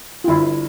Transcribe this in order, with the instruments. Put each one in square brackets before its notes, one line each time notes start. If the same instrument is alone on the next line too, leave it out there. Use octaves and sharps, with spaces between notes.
[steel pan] F4
[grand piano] G1 [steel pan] E4